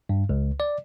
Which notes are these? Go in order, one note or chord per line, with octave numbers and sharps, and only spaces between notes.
G2
C#2
D5